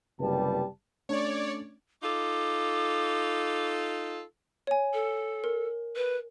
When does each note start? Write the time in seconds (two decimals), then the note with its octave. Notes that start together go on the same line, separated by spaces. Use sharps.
0.19 F#1 C3 G3 G4 B4 A5
1.09 A3 C#4 D4 C#5 D5
2.02 D#4 F4 A4 D6
4.67 C#5 G#5
4.93 A4
5.44 A#4
5.95 B4